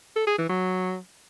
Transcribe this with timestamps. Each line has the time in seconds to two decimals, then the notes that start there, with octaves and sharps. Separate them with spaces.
0.16 A4
0.27 G#4
0.38 E3
0.49 F#3